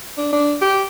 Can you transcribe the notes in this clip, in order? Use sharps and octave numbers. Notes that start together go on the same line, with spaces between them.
D4
D4
G4